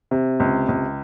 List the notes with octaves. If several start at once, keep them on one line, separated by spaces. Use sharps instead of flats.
C3
C#2
C#2